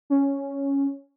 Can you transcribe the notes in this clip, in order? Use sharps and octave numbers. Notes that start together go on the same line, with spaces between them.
C#4